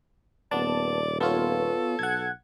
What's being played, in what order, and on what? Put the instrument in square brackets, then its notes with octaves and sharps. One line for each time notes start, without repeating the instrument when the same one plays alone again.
[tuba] D#1 [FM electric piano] B3 A5 [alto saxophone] D5
[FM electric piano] B3 F4 C#5 [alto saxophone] A4
[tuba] B1 [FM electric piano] F#5 G#6